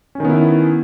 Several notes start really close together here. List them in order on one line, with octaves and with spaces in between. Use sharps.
C#4 D#3 B3 E4